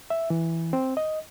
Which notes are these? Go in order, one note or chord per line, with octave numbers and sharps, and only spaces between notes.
E5
E3
C4
D#5